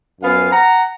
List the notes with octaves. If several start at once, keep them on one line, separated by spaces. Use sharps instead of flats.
F#2 F3 B3 F5 G#5
F#5 A#5